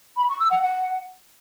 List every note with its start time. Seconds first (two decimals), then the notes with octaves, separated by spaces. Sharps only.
0.17 B5
0.28 C#6
0.39 E6
0.50 F#5
0.61 F#5